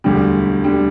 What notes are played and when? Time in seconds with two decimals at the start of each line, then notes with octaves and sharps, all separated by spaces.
0.04 E1 D2 D3 G3
0.64 D3 G3